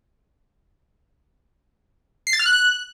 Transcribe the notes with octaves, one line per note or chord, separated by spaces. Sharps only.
C7
A6
F6
F#6